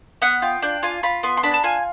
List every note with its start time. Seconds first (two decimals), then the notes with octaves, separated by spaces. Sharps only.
0.22 B3 F#5
0.42 F4 G5
0.62 D4 G5
0.83 F4 G#5
1.03 F4 B5
1.23 B3 C6
1.37 C6
1.43 D4 B5
1.54 A5
1.63 F4 G#5